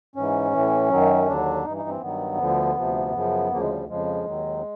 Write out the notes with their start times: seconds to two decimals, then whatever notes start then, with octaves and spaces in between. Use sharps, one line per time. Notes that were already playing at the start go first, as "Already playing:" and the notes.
0.16 G#2 E3 C#4
0.52 A2 E3
0.90 F#2 D#3 F#3
1.27 D#2 D3 F#3 D4
1.64 G2 D#4
1.69 E3
1.77 D#4
1.89 C4
2.01 G2 D#3 F#3 B3
2.38 D2 D3 F3
2.76 D2 C3 F3
3.13 F#2 C#3 F3
3.50 D2 C#3 F3 A#3
3.60 G#3
3.70 G3
3.88 F2 C#3 F3 G#3
4.26 D#2 D#3 F#3